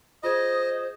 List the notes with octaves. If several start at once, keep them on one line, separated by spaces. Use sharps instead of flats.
F4 G#4 C5 D#5 D#6 G#6